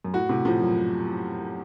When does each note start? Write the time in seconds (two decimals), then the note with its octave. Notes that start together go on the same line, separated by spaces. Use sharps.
0.05 F#2
0.13 A2 F#4
0.29 A2 C3
0.45 A2 C3 F3
0.61 F#2 A#2